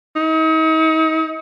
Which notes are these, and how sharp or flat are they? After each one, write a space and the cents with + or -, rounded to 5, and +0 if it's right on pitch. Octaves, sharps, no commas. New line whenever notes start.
D#4 +40